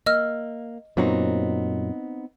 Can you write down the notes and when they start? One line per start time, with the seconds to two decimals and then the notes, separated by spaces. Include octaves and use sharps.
0.06 A#3 D#5 E6 F6
0.97 F#2 A#2 F#3 B3 C4 D#4